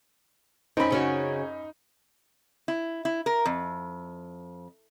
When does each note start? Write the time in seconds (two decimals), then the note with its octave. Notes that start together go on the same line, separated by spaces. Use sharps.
0.77 F#2 C4 C#4 D#4 B5
0.90 C#3 C#4 F#4
2.68 E4
3.05 E4
3.26 A#4
3.45 F2